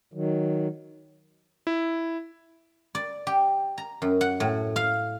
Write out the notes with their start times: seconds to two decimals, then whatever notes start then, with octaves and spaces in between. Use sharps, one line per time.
0.14 D#3 F#3
1.67 E4
2.95 D5
3.27 G4
3.78 A#5
4.02 F#2
4.21 F#5
4.40 A2
4.76 F5